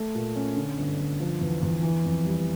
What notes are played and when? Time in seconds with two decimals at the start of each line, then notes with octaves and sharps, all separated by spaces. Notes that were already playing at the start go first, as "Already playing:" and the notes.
Already playing: A3
0.15 A#2
0.36 C#4
0.57 D3
0.78 G1
0.99 G1
1.20 F3
1.41 E2
1.62 E2
1.83 E3
2.04 F2
2.25 G3